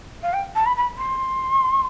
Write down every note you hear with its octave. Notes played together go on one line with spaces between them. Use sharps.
F5
G5
A5
B5
B5
C6